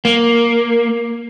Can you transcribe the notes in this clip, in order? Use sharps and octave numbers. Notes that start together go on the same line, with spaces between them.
A#3